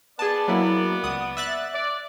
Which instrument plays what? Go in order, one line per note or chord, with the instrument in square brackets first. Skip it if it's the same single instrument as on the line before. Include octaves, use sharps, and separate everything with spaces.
[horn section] B3 D5 [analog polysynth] G#4 A5
[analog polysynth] F#3 A#3 E4
C#2 F#5 D#6
E5 F#6 A6
[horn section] D5